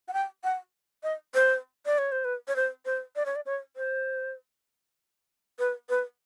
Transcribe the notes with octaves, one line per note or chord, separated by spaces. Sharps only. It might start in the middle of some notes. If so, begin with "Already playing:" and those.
F#5
G5
F#5
D#5
C5
D5
C#5
C5
B4
C#5
C5
C5
D5
C#5
D5
C#5
C5
B4
B4